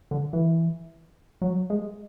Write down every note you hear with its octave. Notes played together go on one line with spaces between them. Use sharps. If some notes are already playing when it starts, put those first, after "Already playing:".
D3
E3
F#3
G#3